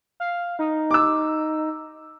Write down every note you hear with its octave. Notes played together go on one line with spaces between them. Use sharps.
F5
D#4
D6 E6